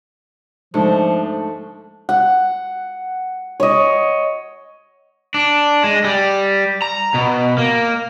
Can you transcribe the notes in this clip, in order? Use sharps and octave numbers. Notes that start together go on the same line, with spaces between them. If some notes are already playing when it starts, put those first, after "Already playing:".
G#2 D3 F3 A3
F#5
C#5 D#5
D4
G#3
G3
A#5
B2
A#3